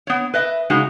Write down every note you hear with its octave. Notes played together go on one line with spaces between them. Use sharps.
B3 C#5
B4 D#5 E5
C#3 G#3 D#4 F#4